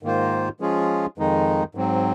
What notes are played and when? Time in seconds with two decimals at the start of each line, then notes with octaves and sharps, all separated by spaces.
0.03 G#2 D#3 A#3 F4 C5
0.60 F3 G#3 C#4 F4 G#4
1.18 F2 D#3 G#3 D#4
1.75 G#2 F#3 C4